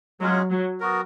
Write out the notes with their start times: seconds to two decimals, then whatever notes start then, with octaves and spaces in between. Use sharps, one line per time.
0.21 F#3 G#3 C#4 F4 G#4
0.51 F#3
0.80 B3 F#4 A#4